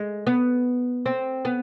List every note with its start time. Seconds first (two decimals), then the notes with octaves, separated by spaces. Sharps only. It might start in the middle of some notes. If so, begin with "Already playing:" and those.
Already playing: G#3
0.27 B3
1.06 C4
1.45 B3